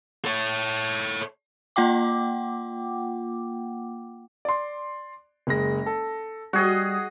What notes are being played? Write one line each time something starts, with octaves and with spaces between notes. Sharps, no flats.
A4 C#5
A#3 F4 F#5 G5 D6
D5 C6
F#1 G#3 A#6
A4
G3 F#4 G#4 D#5